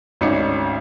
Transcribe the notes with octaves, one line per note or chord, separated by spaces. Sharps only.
G#1 D2 C#4 D#4 D5 C#7